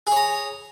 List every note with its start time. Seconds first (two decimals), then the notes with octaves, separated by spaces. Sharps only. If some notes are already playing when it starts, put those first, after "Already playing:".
0.07 G#4
0.12 C#5
0.16 A#5